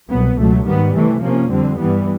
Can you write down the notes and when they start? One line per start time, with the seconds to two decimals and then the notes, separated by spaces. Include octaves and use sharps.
0.10 C2 B2 F#3 B3
0.38 C#2 B2 F#3 A3
0.65 G#2 D#3 G3 B3
0.94 C3 E3 A3
1.22 C3 F3 A#3 C#4
1.50 F2 D3 G3 C4
1.78 G2 E3 G3 B3